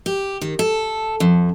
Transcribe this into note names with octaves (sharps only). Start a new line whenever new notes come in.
G4
D#3
A4
F2